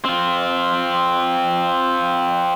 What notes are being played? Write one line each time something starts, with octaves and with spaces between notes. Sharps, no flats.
C4 F4